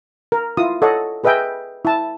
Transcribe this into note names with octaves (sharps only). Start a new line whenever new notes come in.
A#4
E4 F4 D#6
A4 C#5 D#5 F#5
G#4 B4 D#5 E5 G5 G#5
E4 A5